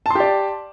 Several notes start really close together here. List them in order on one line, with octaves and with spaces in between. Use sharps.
A5 C6 G4 D5